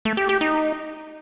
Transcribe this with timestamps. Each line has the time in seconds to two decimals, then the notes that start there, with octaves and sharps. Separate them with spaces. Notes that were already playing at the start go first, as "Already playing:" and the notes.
0.05 A3
0.17 G4
0.29 G4
0.41 D#4